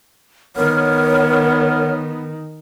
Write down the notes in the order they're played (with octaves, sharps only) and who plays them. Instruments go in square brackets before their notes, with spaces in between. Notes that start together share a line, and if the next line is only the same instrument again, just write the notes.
[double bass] D#3 [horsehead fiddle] B3 [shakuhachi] A#4 [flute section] C#5 F#5 F6